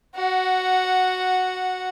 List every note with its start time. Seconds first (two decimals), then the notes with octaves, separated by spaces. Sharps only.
0.16 F#4 F#5